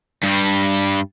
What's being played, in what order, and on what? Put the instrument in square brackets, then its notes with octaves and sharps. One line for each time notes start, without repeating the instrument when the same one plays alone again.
[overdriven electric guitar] G2 G3